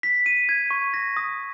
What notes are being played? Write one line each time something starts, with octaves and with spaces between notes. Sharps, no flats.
B6
D#7
G#6
C#6
A#6
D#6